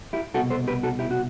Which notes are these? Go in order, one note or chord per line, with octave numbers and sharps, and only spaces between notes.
E4 G4
C2 B2 F#4 A4
A4 C5
G4 B4
F#4 A4
E4 G4
F#4